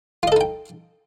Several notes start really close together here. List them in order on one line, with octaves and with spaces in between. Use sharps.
F4 D#5 A4 D#4 G5